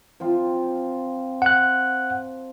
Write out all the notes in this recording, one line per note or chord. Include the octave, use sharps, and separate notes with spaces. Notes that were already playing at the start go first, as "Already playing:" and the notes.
F3 C4 F4
F#5 F#6